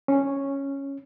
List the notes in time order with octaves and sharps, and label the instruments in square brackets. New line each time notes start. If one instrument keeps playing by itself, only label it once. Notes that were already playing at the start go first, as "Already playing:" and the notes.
[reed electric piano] C#4